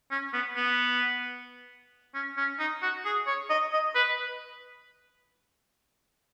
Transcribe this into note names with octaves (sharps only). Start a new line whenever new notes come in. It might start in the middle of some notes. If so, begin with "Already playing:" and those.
C#4
B3
B3
C#4
C#4
D#4
F#4
G#4
C#5
D#5
D#5
B4